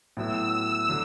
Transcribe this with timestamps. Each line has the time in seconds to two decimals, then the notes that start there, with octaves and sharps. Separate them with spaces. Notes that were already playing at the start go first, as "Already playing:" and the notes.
0.17 A2 F#3 B3 E4 E6
0.53 E6
0.89 D3 F#3